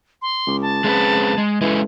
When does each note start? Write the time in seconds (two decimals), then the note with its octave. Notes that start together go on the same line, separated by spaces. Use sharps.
0.22 C6
0.47 C#2
0.62 A5
0.84 C#3 G#3 C4 B4
1.38 G#3
1.61 E3 G#3 C#4 A4